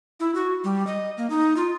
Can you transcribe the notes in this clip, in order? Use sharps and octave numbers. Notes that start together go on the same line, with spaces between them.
E4
F#4
G3
D#5
A#3
D#4
F4